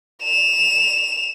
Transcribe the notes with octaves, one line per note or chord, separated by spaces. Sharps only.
E7 F7